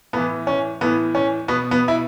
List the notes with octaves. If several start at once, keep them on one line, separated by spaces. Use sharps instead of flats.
A2 E3 B3
C#4
A2 E3 B3
C#4
B2 B3
B3
E4